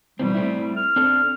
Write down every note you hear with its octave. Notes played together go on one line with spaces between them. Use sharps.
B2 E3 G3 C4
A3 C4 E4
F6
C4 D4 A4